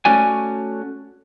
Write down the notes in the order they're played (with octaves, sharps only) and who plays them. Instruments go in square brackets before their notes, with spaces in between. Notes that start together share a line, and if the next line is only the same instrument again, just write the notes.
[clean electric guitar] A3 C#4 F#4 D5 G#5